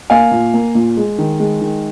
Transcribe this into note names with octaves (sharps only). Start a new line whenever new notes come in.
A#3 F5 G#5
A#2
A#3
A#2
G#3
D#3
G#3
D#3